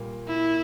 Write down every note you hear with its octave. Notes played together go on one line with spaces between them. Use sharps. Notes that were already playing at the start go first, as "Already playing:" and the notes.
Already playing: A#2 G3 A#3
E4